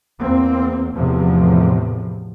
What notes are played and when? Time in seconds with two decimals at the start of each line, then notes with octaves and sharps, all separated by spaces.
0.21 E2 A#3 C4
0.93 E2 A2 C3 F3